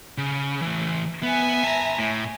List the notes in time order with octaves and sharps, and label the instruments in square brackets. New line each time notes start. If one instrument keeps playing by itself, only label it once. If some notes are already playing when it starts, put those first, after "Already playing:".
[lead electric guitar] C#3
E3 A3
[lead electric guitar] B3 [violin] E5 G#5
[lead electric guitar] A5 A#5
A2